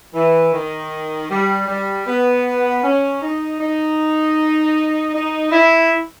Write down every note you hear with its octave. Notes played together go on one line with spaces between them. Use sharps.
E3
D#3
G3
G3
B3
C#4
D#4
D#4
D#4
E4